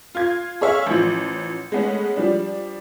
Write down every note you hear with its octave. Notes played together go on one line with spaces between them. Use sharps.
F4 G#6
G#4 C#5 E5 F5
A1 F3
G#3 A3 B3 C#4
F3 G3 D4